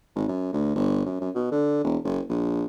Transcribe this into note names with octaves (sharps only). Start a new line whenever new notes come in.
G#1
F#2
D2
G1
F#2
F#2
B2
D3
E1
F#1
A#1